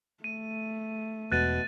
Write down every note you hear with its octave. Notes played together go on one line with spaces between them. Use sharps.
A3 D#7
E1 B2 F#6 A6 D#7